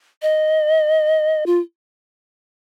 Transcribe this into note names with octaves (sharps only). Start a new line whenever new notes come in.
D#5
F4